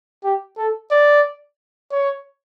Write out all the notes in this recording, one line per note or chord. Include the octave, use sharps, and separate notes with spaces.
G4
A4
D5
C#5